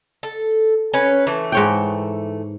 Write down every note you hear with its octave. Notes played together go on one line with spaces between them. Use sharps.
A4
C#4 B4
E3 A3
G#2 C#5 G5